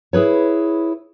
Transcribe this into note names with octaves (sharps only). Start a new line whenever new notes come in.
E4 G#4 B4 C#5